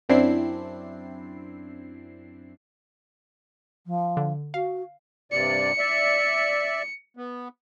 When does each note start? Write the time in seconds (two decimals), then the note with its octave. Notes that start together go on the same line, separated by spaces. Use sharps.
0.09 F#2 C4 D4 E4 C7
3.86 F3
4.17 D3
4.54 F#4 F5
5.32 G2 C3 D5 C#7
5.78 D5 E5
7.17 B3